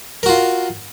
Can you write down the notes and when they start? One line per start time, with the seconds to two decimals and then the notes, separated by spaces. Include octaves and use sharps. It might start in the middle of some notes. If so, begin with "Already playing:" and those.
0.23 A#4
0.26 F#4
0.29 F4